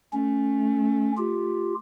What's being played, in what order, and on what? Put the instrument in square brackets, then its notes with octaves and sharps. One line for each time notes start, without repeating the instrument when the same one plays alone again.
[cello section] A3 [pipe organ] C#4
[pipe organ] F4 G4